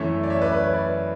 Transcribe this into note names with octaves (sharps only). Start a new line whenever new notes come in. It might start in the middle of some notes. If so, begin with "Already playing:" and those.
Already playing: F#2 E3 A3 C#4 C#5 E5
D5
C#5 E5
B4 D5
B4
C#5
B4 D5